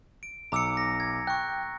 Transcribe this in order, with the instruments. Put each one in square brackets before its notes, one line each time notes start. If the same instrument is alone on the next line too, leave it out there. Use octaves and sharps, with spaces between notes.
[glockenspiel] D7
[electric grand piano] B1 D6 [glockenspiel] A#5 E6 C#7
[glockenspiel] A#6
G#6
[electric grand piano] G5 [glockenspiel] C#6 F#6